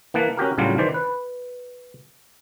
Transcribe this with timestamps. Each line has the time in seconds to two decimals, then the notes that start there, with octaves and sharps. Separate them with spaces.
0.14 E3 A#3 F#5 A5
0.37 C#4 F#4 G4 A#4
0.58 A2 C#3 F#3 G3 D4 F4
0.78 D#3 E3 C5 D5
0.94 B4